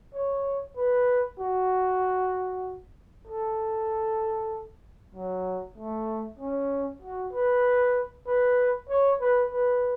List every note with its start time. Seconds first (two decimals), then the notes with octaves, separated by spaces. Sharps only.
0.14 C#5
0.77 B4
1.39 F#4
3.27 A4
5.15 F#3
5.77 A3
6.40 C#4
7.02 F#4
7.33 B4
8.27 B4
8.89 C#5
9.21 B4
9.52 B4